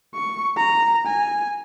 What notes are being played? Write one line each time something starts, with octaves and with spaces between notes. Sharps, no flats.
C#6
A#5
G#5